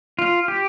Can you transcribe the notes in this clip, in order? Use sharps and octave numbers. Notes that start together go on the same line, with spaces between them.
F4
G4